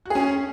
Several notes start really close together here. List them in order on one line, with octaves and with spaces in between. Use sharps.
F#4 G#4 C#4